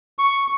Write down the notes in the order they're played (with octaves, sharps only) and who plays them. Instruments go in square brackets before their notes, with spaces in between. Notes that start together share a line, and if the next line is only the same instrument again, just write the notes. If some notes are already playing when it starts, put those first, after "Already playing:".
[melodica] C#6